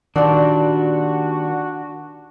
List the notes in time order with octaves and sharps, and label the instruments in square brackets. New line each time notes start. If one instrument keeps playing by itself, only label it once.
[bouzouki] A#2 G3 [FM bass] D#3 [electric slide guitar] D4 [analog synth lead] F#4